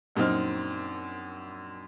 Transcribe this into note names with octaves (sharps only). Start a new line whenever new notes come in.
A#1 F#2 C4 D#4 F6